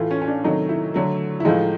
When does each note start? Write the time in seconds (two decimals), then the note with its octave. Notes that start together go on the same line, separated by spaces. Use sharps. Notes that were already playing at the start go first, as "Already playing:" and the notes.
Already playing: A2 E3 A3 F4
0.11 C#4
0.22 C#4
0.28 D4
0.44 C3 D#3 F#3 A3 D#4
0.69 E4
0.94 D3 F#3 A3
1.40 E4
1.45 A2 F3 G#3 D#4